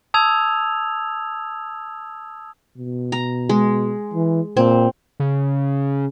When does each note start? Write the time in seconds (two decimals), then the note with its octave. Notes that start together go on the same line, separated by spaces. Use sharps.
0.14 A5 D#6 E6 G#6 F7
2.77 B2
3.12 A#5
3.49 G#3
4.14 E3
4.57 A#2 C4
5.20 C#3